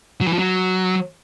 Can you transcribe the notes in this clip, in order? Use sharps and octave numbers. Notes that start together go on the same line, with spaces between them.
F#3
E3
F3
F#3